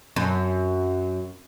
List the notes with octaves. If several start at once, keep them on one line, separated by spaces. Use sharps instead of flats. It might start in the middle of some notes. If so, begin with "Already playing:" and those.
F#2